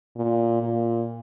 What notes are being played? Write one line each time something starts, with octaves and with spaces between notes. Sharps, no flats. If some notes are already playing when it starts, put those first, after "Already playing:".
A#2
A#2